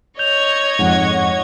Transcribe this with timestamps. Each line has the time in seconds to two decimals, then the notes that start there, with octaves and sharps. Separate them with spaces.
0.19 C#5 D#5 G6 G#6 F7
0.79 F2 G#2 F#5